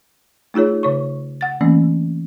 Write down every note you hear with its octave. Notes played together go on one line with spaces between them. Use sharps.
A3 D#4 F4 G#4 C#5
C#3 C#5 C#6
F#5 A6
E3 A3 A#3 C4 C#4